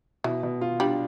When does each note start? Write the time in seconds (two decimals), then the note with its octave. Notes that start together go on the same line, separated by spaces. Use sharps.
0.24 B2 E3
0.43 B2
0.61 F4
0.80 G3 D4